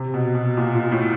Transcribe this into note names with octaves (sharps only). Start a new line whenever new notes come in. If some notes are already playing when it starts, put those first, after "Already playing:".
Already playing: C3
B2
B2
A#2
A#2
A2